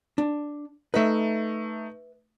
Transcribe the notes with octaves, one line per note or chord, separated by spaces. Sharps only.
D4
A3 D#4 B4 E5